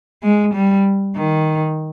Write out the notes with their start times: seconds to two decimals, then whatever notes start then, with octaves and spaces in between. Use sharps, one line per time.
0.23 G#3
0.54 G3
1.16 D#3